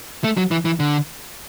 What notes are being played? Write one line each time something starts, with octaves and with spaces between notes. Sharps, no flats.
A3
F#3
E3
E3
D3